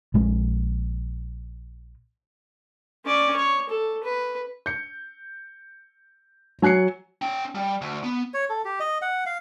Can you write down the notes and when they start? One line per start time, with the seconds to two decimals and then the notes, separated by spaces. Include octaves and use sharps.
0.14 A#1 G#3
3.05 C#4 D5
3.36 C#5
3.69 A4
4.03 B4
4.66 G6 C#7
6.62 F#3 G#5 F#6 C7 C#7
7.22 C#4 G5
7.55 G3
7.82 D2
8.03 B3
8.34 C#5
8.50 A4
8.65 G4
8.80 D#5
9.02 F#5
9.26 F5